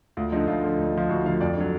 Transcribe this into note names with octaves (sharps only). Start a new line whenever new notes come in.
D2 F4
D3 F3 D#4
D2 F4
D3 F3
D2
D3 F3
D2 F#4
D3 F3 F5
F2 D5
D3 F#3